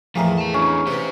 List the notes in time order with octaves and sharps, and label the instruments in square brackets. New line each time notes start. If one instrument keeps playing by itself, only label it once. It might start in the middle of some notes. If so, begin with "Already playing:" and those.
[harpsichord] E2 A2 A3 [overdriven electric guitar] F3 [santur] A#3 G#4 A#4
[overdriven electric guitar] E5 A5
[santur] C#4 [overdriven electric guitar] D4 E4
[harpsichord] B3 D#4 [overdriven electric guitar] G4 C5